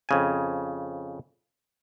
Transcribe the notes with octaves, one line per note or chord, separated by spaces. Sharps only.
F2 C#3 G#5